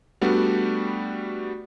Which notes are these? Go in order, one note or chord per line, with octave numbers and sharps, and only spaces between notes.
G3 A3 B3 D4 F#4